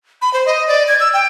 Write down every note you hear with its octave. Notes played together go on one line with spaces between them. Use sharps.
B5
C5
D#5
D5
G#6
E6
G5